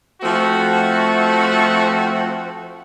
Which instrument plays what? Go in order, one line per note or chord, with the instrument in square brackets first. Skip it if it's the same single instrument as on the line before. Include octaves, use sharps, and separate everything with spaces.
[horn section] F3 A3 C4 F#4